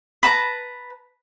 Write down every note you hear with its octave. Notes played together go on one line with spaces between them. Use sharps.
B4 A5 A#5